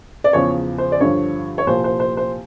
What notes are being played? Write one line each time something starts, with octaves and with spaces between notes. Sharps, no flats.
D5
E2 C#3 F3 C#5
C5
D5
G2 D3 F3 C#5
C#5
C2 A#2 F3 C5
C5
C5
C5